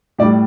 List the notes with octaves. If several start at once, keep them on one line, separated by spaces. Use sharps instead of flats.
A2 G3 D5